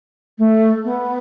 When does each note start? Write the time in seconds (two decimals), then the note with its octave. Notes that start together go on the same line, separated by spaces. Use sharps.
0.38 A3
0.85 B3